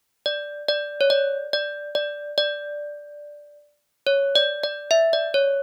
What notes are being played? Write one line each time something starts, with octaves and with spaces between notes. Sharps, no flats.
D5
D5
C#5
D5
D5
D5
D5
C#5
D5
D5
E5
D5
C#5